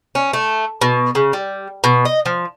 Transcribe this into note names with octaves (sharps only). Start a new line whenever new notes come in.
C#4
A3
B2
C#3
G3
B2
D#5
F3